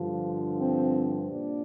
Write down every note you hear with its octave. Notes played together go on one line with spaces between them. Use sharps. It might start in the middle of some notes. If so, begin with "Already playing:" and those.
Already playing: G2 D3 F3
C4
A#2 D4